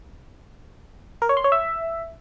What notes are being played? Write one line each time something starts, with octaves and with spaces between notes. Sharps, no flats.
A#4
C#5
C6
C#5
E5